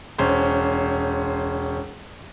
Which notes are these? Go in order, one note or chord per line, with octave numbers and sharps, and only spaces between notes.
E1 C#4 C5